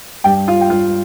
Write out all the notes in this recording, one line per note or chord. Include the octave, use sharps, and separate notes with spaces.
G2 G4 G5
F4 F5
G5
G2 F4 F5